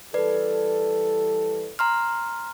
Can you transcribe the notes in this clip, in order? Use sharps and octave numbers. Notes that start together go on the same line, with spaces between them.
E3 G3 A4 B4 D5
A#5 C6 F6